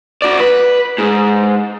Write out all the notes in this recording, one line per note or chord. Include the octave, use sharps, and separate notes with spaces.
F#4 D5
B4
G#2